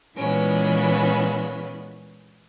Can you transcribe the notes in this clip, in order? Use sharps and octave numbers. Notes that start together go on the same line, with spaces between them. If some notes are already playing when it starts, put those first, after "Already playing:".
A#2 E3 G#3 B3 C#4